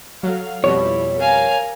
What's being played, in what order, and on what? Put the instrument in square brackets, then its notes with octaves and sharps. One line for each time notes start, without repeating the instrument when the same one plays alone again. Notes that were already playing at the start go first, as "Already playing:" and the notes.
[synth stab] F#3 [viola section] A4 F5
[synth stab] F2 B2 [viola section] G3 E4 [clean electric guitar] C#5
[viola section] A#4 [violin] F5 G#5